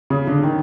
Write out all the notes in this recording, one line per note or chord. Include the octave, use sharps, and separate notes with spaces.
C#3
D3
D#3